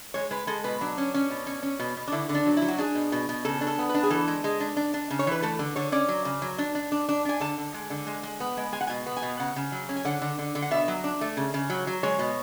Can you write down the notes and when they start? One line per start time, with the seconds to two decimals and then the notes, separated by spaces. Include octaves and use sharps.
0.14 G#3 C#5
0.31 G#3 B4
0.47 G#3 A4
0.64 B2 B4
0.81 F#3 D4
0.98 C#4
1.14 C#4
1.30 B2
1.47 C#4
1.63 C#4
1.80 B2
1.97 B2
2.08 D4
2.12 D3 E4
2.29 D3
2.34 D4
2.46 F#3
2.57 E4
2.62 F#3
2.68 F#4
2.78 D4 G#4
2.95 B2
3.12 B2
3.29 B2
3.45 C#3 A4
3.61 D4
3.67 A4
3.78 B3
3.89 B4
3.95 D4
4.03 G#4
4.10 E3 A4
4.28 G#3
4.44 G#3
4.60 D4
4.77 D4
4.94 D4
5.10 C#3
5.19 C#5
5.27 E3 B4
5.42 A3 A4
5.59 D3
5.76 D3 C#5
5.92 C#4 D5
6.09 F#3
6.25 C#3
6.42 F#3
6.58 D4
6.75 D4
6.92 D4
7.09 D4
7.25 D4 G#5
7.40 D3 A5
7.58 D3
7.74 G#3
7.90 D3
8.07 G#3
8.23 G#3
8.40 B3
8.57 G#3
8.72 G#3 G#5
8.81 F#5
8.87 B2 G#5
9.06 B3
9.17 G#5
9.22 B2
9.40 C#3 F#5
9.56 C#3
9.72 F#3
9.89 C#4
9.96 G#5
10.05 D3 F#5
10.22 D3
10.39 D3
10.55 D3
10.62 F#5
10.71 B2 E5
10.88 F#3
11.04 D4
11.21 A3
11.37 C#3
11.54 C#3
11.70 F#3
11.87 F#3
12.03 G#3 C#5
12.19 B2